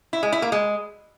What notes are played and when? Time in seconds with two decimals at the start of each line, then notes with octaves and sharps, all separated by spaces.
0.13 E4
0.23 G#3
0.32 E4
0.42 A#3
0.52 G#3